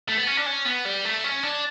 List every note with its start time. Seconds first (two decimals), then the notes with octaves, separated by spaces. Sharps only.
0.08 A3
0.17 B3
0.27 C#4
0.37 D4
0.47 C#4
0.66 B3
0.86 G3
1.05 A3
1.24 C#4
1.43 D4